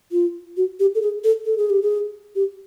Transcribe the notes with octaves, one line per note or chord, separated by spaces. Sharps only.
F4
F#4
G4
A4
G#4
A4
A4
G#4
G4
G#4
G4